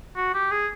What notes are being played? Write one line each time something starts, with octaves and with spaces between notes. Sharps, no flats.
F#4
G4
G#4